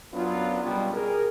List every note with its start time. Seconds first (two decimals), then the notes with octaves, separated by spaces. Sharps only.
0.14 F#2 F#3 B3 D4 F4
0.64 C#2 B2 G3
0.94 G#4 A#4